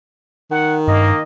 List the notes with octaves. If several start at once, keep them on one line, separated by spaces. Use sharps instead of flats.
D#3 F#5
G2 A#3 D#5